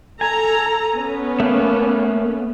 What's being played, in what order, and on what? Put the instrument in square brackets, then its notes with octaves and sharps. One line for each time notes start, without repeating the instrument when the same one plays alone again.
[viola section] A4 A#5 [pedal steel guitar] G#5
[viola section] B3 C#4
[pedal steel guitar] A3 A#3